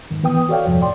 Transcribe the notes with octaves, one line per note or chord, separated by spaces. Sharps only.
G#2 D#3
E3 B3 B4 G5 D#6
F#4 A4 C#5 D5 F5 G5
E2 G2 C3 F3
A2 D5 G5 C6